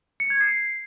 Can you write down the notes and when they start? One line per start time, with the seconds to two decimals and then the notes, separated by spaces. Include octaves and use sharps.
0.20 C#7
0.30 G#6
0.41 C7